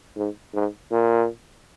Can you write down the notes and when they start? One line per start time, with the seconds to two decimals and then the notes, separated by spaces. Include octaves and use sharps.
0.16 G#2
0.54 G#2
0.92 A#2